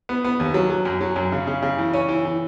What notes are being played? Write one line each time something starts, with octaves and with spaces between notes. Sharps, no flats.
B3
B3
D#2
F#3
F#3
F#2
F#3
F#2
C#3
C#3
C#3
E3
C#4
E3
E3